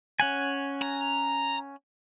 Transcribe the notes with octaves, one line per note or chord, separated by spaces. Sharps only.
C#4 F#5 G#5
A#5